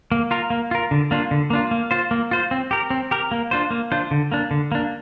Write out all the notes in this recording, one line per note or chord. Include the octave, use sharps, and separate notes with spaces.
A#3
F4 A#4
A#3
F4 A#4
D3
A#3 D4 F4
D3
A#3 D4 F4
A#3
F4 C5
A#3
F4 C5
C4
G4 A#4
C4
G4 A#4
A#3
D4 F4 C5
A#3
D4 F4 C5
D3
A#3 D4
D3
A#3 D4